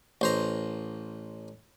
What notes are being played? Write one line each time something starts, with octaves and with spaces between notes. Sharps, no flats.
A1 C5 A#5